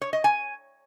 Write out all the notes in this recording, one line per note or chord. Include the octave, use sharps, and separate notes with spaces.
C#5
D#5
G#5